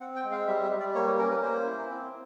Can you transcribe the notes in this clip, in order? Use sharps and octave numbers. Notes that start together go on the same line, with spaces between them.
C4 F#5
G5
G#3
F5
G3 E5
E5
G3
D5
A#3 C#5
B4
C#4 A#4
B4
A#3 C5
E4
C4